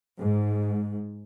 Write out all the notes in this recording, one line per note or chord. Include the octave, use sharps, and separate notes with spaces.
G#2